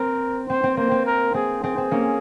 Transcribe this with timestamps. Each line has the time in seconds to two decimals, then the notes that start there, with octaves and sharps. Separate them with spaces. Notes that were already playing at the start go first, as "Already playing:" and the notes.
Already playing: C4 A#4
0.49 C4 C5
0.63 C4
0.77 A#3 C5
0.91 C4
1.06 A#4
1.34 C4 G#4
1.63 C4 G#4
1.78 C4
1.91 A#3 C#4